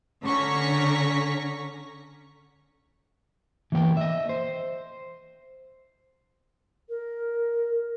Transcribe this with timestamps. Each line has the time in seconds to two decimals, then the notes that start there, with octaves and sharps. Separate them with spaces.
0.24 D3 C#4 A#5 C#6 B6
3.72 E3 A#3 B3 G5
3.97 D#5 E5
4.29 C5
6.89 A#4